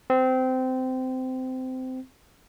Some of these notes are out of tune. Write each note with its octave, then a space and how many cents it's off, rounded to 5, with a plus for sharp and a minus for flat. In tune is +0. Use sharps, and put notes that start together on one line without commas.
C4 -20